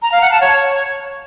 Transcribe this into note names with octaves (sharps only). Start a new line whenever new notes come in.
A#5
F5
F#5
A5
C#5